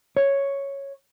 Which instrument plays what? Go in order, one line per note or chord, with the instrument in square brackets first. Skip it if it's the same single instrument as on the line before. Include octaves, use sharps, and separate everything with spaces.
[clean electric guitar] C#5